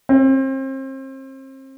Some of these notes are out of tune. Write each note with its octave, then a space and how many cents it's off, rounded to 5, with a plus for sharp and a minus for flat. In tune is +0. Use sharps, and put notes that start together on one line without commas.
C4 +35